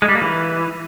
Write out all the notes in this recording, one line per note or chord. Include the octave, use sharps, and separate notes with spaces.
G#3
G3
A#3
E3